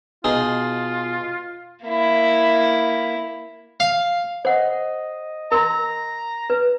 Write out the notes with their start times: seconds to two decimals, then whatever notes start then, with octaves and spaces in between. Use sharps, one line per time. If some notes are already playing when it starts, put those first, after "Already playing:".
0.24 B2 D#4 F4 G#4
1.84 A#3 E4
3.80 F5
4.45 C5 D#5 F#5
5.52 A#4 A#5 C6
6.50 B4